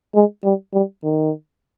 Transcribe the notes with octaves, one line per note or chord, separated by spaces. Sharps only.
G#3
G3
G3
D#3